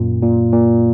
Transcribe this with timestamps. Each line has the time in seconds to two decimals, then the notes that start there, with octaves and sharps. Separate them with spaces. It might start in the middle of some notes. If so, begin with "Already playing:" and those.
Already playing: F#2 A#2
0.23 A#2
0.53 A#2